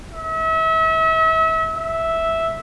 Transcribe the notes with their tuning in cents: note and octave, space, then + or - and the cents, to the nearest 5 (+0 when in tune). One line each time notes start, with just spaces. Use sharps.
E5 -35
E5 -5